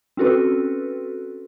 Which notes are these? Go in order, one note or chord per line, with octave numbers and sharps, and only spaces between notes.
C4 C#4 F#4 A4 B4